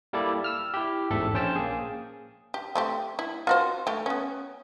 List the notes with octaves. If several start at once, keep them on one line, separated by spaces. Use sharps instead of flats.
G3 A#3 E4 A4 D5
E6 F6
E4 G4
A1 E2 G#2 A4 E5
A#1 C#4 C5 G5 A5
A#3 G#4
G4
A3 C4 G4
E4
F4 F#4 C5
A3 G4
B3 C#4